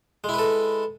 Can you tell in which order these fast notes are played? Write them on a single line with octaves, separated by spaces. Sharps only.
G#3 E4 B4 A4